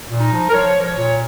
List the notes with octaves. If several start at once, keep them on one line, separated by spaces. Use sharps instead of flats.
A#2
D#4
F3
A#4
F3 C#5
F3 A#4
C#5
A#2